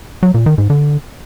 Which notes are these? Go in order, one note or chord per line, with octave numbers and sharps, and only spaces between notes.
F#3
A#2
D#3
G#2
D3